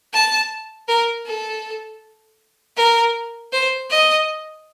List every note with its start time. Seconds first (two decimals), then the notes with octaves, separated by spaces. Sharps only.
0.14 A5
0.88 A#4
1.26 A4
2.77 A#4
3.53 C5
3.90 D#5